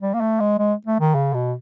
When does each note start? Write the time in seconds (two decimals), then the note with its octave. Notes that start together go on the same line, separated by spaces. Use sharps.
0.02 G3
0.14 A#3
0.21 A3
0.40 G#3
0.59 G#3
0.87 A3
1.00 D#3
1.15 C#3
1.34 B2